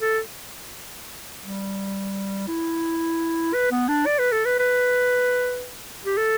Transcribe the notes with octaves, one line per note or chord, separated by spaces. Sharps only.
A4
G3
E4
B4
B3
D4
D5
B4
A4
B4
B4
G4
A4